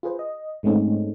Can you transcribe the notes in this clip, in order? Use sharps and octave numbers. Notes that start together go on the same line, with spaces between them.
F4 G#4 B4 C5
D#5
G#2 G#3 A3 C4 C#4 D#4